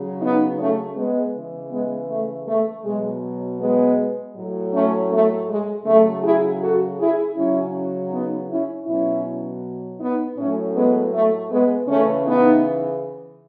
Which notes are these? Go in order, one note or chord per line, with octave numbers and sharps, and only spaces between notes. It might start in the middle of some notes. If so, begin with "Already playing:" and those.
Already playing: C#3 F#3
B3 D#4
A3 C#4
G#3 B3
C#3 E3
G#3 B3
A3
A3
B2 F#3 G#3
G#3 B3
A2 F#3
A3 C#4
A3
G#3
C#3 F#3 A3
E4 G#4
F#4 A4
E4 G#4
C#3 F#3 C#4 E4
B3 D#4
C#4 E4
B2 F#3 C#4 E4
B3 D#4
A2 F#3 A3 C#4
G#3 B3
A3
G#3 B3
C#3 E3 A3 C#4
B3 D#4